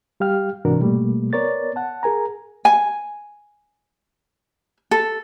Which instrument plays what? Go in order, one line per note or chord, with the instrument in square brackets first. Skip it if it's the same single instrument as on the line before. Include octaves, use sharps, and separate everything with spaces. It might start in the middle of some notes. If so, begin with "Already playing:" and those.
[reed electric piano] G3 G4 F5 G5 F6
G#2 C3 E3 D4 F#4 A#4
B2 G3 A3 A#3
B3 A#4 C#5 D5 A6
F#5 A5
G#4 A#4 G#5 A#5
[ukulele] G#5
A4